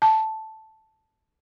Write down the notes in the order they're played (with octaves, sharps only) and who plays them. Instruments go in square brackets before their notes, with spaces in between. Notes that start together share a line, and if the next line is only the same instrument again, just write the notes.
[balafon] A5